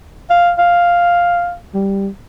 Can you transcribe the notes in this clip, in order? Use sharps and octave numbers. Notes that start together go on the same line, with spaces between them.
F5
F5
G3